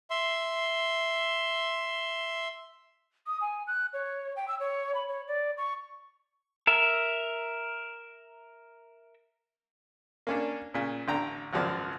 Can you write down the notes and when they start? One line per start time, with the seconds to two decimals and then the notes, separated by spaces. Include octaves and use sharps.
0.10 E5 C6
3.27 D#6
3.41 G#5
3.67 F#6
3.93 C#5
4.36 G5
4.48 E6
4.60 C#5
4.95 B5
5.08 C#5
5.28 D5
5.58 C#6
6.67 A#4 E5
10.27 A#3 C#4 D4
10.74 A#2 C#3
11.08 A1 D3 G5 A#5
11.53 G#1 C#2 F#2 F3 D5